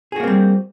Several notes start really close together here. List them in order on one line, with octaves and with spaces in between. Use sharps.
G#4 F#4 A#3 C4 G3